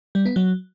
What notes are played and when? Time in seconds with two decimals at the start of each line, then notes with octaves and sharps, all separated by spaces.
0.15 G3
0.25 B3
0.36 F#3